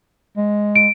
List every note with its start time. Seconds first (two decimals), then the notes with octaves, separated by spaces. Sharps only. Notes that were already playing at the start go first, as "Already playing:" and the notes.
0.37 G#3
0.76 D7